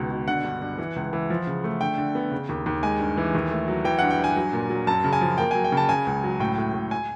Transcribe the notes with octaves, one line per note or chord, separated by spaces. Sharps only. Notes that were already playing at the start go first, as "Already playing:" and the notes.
Already playing: C#2 B2 D#3
B2
D3 F#5
G2
G2
E3
C#2
E3
F3
C#3
A3
D3 G5
D3
B3
C#3
D#2
D#2
G#3 G#5
G2
E3
D#2
A3
F#3
E3 G5
G2 F#5
G5
G2 G#5
F#3
A#2
F#3
F#2 A5
C#3
G#5
F3
A#3 G5
F#3 G#5
G5
C#3
A5
C#3 G#5
C#2
F#3
A2 G5
A2
A2
G#5